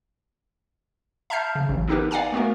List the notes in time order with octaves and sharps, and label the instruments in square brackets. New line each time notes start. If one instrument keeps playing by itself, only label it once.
[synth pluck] E5 A5 A#5 F6 G6 C7
C#3
A1 F#3
B3 C4 D#4 G4 A#4 B4
D5 F5 F#5 G#5 A#5
A3 B3 F#4 A#4